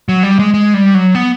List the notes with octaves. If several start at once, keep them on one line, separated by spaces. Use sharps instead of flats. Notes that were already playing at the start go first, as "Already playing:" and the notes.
F#3
G3
G#3
G#3
G3
F#3
B3